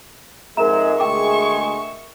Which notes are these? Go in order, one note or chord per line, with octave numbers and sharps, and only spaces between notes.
F2 G#2 G#3 A#4 E5 A#5 E7
D2 G#3 G#4 G5 C#6 D6